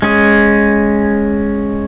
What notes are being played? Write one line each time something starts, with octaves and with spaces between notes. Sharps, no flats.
G#3 C#4 G#4